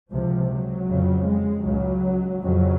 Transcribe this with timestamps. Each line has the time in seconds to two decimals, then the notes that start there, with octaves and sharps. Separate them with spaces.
0.11 C#2 C3 F3
0.49 F#3
0.88 F2 C#3
1.26 G#3
1.64 C#2 C#3 F#3
2.41 F2 C#3 F#3